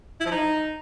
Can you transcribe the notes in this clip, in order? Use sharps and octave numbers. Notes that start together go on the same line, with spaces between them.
E4
F3
D#4